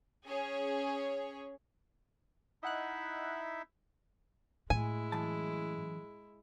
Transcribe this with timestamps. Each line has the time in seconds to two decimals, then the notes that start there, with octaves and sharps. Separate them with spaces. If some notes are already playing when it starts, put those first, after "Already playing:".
0.27 C#4 G#4 C#5
2.63 D#4 E4 D#5 E5 F#5 F#6
4.70 A2 G#3 E4 G#5
5.12 F#2 E3 A5